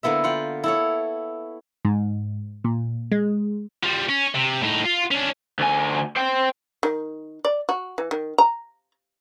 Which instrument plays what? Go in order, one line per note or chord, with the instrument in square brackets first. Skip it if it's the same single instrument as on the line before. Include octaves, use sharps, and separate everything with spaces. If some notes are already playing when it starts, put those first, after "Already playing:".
[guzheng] D3 A#3 B3 E4 E5
F4 F#5 G5
E4 A4 C#5
[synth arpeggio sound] G#2
A#2
G#3
[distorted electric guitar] F3 G3
C#4
C3
A2 D#4
F4
C#4 D4
[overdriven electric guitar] D2 G#5
C5 G5
[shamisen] D#3
D5
F#4
E3
D#3
A#5